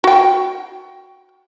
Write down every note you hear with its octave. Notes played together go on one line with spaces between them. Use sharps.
F#4 G5